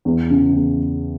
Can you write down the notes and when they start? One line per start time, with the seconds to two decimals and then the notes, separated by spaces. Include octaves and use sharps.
0.05 E2
0.30 C#3
0.54 E2